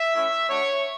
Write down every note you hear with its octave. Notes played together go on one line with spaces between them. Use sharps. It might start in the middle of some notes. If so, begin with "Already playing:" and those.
Already playing: E5
A3 C#4 E4
A3 D4 F#4 C#5